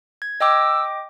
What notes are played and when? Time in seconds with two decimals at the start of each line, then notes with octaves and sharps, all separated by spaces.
0.22 G#6
0.41 D#5 G5 D6 E6